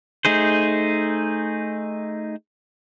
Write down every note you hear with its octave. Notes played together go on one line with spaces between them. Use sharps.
A3 D#4 G#4 C5